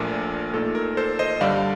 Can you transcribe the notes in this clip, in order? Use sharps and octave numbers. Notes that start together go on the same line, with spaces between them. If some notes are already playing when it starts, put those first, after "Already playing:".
Already playing: A#1 A#2 A3 D4 A#4
A#2 A3 D#4 A4
A#4
A4 C5
C5 D#5
G2 D3 G3 D5 F5